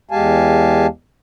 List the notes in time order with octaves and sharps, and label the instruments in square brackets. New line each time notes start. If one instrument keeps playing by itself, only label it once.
[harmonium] E2 G#3 G4 F5 G#5 A5